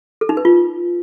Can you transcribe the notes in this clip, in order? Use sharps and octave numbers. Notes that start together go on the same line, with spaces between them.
A4
D#4
B4
F4